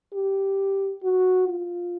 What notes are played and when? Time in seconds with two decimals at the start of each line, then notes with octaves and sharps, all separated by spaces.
0.14 G4
1.03 F#4
1.48 F4